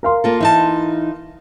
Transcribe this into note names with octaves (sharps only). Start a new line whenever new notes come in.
A#4 F5 C6
A#3 F4 A4
E3 D#4 A5